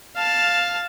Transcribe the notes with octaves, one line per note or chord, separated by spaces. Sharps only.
F5 A5